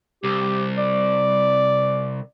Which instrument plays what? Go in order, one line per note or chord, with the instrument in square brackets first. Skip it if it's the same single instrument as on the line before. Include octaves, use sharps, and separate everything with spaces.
[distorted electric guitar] C2 [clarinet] G4
[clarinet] D5